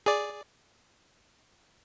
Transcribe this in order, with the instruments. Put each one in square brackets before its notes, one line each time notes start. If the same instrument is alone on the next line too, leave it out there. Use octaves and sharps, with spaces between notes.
[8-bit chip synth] G#4 D5